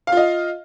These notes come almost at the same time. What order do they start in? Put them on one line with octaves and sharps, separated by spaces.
F5 F4 D#5